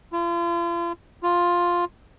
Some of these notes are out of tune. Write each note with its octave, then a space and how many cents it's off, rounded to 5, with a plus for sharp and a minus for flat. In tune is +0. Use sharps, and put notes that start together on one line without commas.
F4 -40
F4 +5